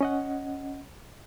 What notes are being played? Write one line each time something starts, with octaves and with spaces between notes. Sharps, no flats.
C#4 D#5 F#5